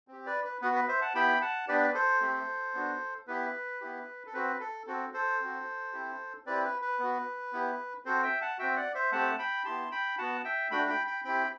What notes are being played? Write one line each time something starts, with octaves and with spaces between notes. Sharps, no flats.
C4 G4
B4 D5
B4
B3 F#4 B4
B4
C5 E5
F#5 A5
B3 E4 G4 G5 B5
F#5 A5
B3 D4 G4 B4 D5
A4 C5
A3 C4 G4
B3 D4 F#4
B3 E4 G4 B4
B3 E4 G4
A4
C4 F#4 B4
A4
C4 F#4 A4
A4 C5
C4 F#4
C4 E4 G4
C4 E4 G4 B4 D5
B4
B4
B3 F#4
B3 E4 G4
C4 F#4 A4 C5
E5 G5
F#5 A5
C4 F#4 E5 G5
D5 F#5
C5 E5
A3 C4 G4 F#5 A5
G5 B5
B3 E4 G4 A5 C6
G5 B5
B3 F#4 F#5 A5
E5 G5
A3 D4 F#4 G5 B5
G5 B5
G5 B5
C4 E4 G4 G5 B5